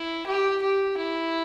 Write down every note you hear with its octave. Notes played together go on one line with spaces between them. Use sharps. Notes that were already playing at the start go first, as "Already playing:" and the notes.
Already playing: E4
G4
G4
E4